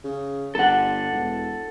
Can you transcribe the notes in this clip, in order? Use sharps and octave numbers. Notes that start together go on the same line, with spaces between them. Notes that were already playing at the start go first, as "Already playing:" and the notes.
C#3
G1 A4 F#5
E1